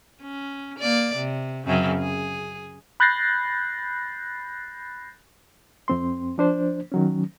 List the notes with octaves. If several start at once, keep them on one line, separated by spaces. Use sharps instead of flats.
C#4
A#3 D5
C3
F#2 C#3 C4
G#4
B5 F#6 G6 A6 A#6 C7
F2 C4 C6
F3 D4 C5
D#3 F#3 C#4